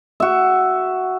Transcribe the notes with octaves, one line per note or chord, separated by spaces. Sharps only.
F#4 E5